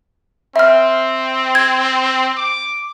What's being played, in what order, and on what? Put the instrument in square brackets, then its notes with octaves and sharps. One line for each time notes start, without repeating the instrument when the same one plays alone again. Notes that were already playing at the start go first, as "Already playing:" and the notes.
[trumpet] C4 [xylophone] E5 F6
[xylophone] G#6
[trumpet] D6